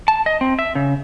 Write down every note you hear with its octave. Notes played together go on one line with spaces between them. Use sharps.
A5
D#5
C4
E5
C#3